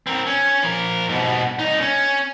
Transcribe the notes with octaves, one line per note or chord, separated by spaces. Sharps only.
C4 A#4
C#4
F3 A#4
G#2 B2
C2 D#4
C#4